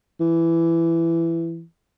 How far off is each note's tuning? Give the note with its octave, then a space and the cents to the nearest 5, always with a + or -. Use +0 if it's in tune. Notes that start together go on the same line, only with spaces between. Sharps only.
E3 +15